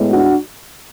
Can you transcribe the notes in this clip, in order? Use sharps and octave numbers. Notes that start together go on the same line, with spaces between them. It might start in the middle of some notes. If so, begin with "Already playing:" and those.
Already playing: A2 G#3 B3
D4 F#4